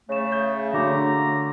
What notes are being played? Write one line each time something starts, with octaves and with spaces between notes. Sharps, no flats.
C#3 A3 C#5 E7
G6
D3 F#4 A#5 D6